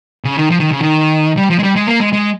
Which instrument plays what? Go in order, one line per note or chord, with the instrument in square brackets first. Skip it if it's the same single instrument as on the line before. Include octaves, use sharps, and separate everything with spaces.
[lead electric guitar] C#3
D#3
F3
D#3
C#3
D#3
G3
F3
G#3
G3
G#3
A#3
G#3
G#3